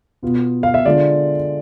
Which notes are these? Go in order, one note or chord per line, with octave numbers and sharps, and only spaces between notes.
B2 B3 F4
F5
E5
D3 G#3 D4 F4 D5